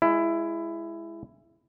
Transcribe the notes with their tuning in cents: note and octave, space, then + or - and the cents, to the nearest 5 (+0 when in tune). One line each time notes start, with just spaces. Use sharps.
G#3 -5 E4 +15